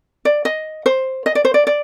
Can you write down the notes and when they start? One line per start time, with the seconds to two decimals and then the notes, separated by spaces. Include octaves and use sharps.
0.25 D5
0.45 D#5
0.86 C5
1.26 D#5
1.35 D5
1.45 C5
1.54 D5
1.67 D5